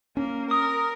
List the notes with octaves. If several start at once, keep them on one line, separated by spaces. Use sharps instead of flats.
A#3 C#4
A#4 D#6